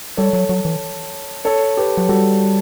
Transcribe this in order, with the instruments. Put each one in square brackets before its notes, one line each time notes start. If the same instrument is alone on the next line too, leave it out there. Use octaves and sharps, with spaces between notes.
[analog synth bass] G3 [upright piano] A4 C#5
[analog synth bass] F#3
F#3
E3
[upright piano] A4 C#5
G4 B4
[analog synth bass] F#3
[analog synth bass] G3 [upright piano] F#4 A4